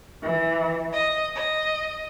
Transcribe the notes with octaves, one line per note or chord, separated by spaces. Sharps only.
E3
D#5
D#5